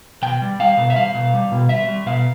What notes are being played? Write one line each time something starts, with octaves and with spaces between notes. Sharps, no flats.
B2 G5
G3
G3 F5
B2
E5
G3 F5
B2
G3
B2
G3 E5
G3
B2 F5